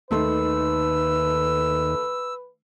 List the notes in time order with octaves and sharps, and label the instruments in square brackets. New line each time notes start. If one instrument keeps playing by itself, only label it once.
[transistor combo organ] D#2 [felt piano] D#3 A3 C6 [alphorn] B4 [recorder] E6